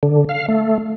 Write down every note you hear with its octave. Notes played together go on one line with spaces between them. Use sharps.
D3
F5
A3